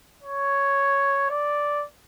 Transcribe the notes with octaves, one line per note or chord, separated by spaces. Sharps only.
C#5
D5